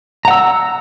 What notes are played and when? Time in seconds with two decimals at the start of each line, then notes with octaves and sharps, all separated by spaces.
0.25 A#5
0.28 F#5
0.31 E6